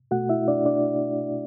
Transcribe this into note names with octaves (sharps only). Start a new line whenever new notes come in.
B2 A3 F#4 F#5
E4 E5
D4 D5
D4 D5